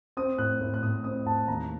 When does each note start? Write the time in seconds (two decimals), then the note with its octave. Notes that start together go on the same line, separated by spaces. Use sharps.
0.17 C4 D#6
0.38 A2 F#6
0.61 A2
0.74 F#6
0.83 A2 D#6
1.04 C4 D#6
1.26 A2 A5
1.48 D#2 A#5